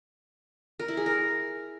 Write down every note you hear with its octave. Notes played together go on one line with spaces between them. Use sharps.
A#4
E4
G#4
A#4